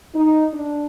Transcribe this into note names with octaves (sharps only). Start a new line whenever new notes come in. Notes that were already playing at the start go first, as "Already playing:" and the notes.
D#4
D4